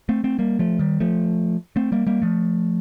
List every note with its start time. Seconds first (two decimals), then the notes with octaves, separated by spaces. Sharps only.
0.09 A3 C4
0.24 A3 C4
0.39 G3 A#3
0.59 F3 A3
0.79 D#3 G3
1.00 F3 A3
1.76 A3 C4
1.92 G3 A#3
2.07 G3 A#3
2.22 F3 A3